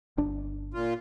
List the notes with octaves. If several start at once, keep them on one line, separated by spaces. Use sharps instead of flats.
G1 D4
A#2 F4